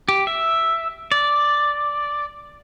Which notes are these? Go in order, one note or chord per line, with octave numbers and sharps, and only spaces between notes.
G4
E5
D5